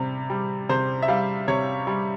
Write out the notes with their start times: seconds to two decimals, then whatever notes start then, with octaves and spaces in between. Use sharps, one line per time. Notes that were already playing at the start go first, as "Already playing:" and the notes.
Already playing: C3 G3
0.30 G3
0.69 C3 C5
1.02 E5
1.08 G3 F5
1.48 C3 C#5
1.87 G3